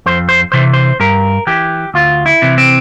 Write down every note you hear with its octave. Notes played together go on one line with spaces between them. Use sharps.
F2 C5
C5
C3 E3 C5
C5
G2 A#4
E3 G4
D2 F4
E4
C3 E3
C4